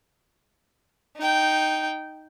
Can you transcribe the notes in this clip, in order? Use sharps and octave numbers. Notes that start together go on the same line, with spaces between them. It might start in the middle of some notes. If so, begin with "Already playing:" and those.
D#4 G5